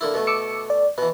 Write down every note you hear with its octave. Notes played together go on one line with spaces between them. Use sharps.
D3 A#3 E4
B2 A3
D6 E6 C#7
D5
B2 E3 B4